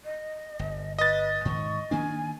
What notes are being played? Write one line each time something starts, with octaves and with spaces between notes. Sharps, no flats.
D#5
G1
B4 D#5 A6
G#2 D#3 C#6
D#3 A#3 D4 G#5